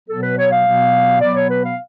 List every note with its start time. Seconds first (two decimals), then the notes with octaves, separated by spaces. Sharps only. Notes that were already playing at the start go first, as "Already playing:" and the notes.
0.09 B2 F#3 B3 A4
0.23 B4
0.38 C#5
0.51 F5
0.65 B2 F#3 B3
1.21 B2 F#3 B3 D5
1.35 C#5
1.49 B4
1.63 F5